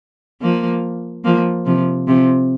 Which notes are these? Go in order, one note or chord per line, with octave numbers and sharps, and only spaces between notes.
F3 A#3
F3 A#3
C3 F3
C3 F3